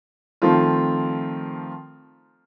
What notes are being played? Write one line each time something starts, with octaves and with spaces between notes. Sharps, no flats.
D#3 F3 A3 C4 F4